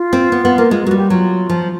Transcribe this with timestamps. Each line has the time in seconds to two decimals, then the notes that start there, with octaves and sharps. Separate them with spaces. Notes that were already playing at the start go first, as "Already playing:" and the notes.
Already playing: F4
0.13 C4
0.32 B3
0.45 B3
0.58 A#3
0.71 G#3 F4
0.85 G#3 F#4
0.91 G3
0.97 G4
1.10 F#3 F4
1.49 F3